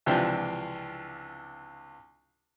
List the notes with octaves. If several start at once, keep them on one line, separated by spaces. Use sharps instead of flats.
C#2 C3 E3 F3 D4 G5